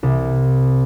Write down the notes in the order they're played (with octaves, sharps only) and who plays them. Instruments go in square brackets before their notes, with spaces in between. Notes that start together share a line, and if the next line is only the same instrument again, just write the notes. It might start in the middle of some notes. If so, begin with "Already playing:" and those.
[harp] C2